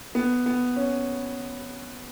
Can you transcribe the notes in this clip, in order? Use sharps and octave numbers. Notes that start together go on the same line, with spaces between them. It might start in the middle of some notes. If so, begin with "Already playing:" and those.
B3
B3
C#4